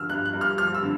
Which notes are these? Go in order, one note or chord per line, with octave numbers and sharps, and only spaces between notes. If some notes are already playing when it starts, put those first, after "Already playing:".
Already playing: D3 F3 E6 F6
G2 F#6
F#6
G2
F6
F3 F6
E6
D3